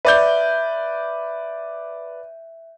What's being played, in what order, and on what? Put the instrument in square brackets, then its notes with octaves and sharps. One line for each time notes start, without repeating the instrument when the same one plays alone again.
[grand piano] B4 D5 G6 [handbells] E5